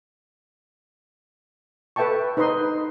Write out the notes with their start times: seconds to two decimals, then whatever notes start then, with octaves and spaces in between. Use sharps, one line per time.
1.96 A4 B4 E5 G5 A5 C#6
2.37 D#4 B4 C5 D#5 C6